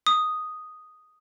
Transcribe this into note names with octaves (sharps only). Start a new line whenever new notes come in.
D#6